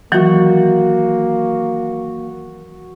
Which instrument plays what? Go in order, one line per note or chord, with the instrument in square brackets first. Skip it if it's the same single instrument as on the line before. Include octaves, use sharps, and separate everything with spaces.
[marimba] D#3 E3 F#3 [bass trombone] A#3 [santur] F#4 F#5